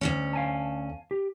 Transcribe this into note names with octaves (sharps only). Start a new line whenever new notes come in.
D2 G2 C#4
F5 G#5 A5
G4